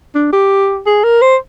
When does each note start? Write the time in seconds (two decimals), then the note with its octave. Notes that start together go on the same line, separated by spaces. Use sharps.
0.15 D4
0.33 G4
0.86 G#4
1.04 A#4
1.22 C5